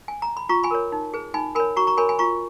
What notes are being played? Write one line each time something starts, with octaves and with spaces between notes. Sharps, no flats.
G#5
A#5
B5
F4 A#5 C#6
G#5 B5
A#4 C#5
D#4
G#4 B4
D#4 G#5 B5
A#4 C#5 G#5 B5
F#4 A#5 C#6
A#5 C#6
A#4 C#5 G#5 B5
G#5 B5
F4 A#5 C#6